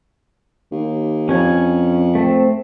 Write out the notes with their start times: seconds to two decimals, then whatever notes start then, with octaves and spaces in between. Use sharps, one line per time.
0.72 D#2
1.29 F2 C#4 G#5
2.15 A3 C4